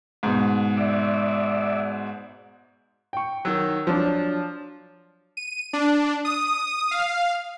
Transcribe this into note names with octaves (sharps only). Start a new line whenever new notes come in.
G#2 B2
D5 E5
G5 C#6
D#3 F#3 E6
F3 F#3 D4
D#7
D4
D#6
F5